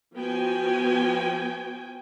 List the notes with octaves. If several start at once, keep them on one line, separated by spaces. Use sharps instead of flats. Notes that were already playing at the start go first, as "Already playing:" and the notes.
F3 B3 F#4 G5 G#5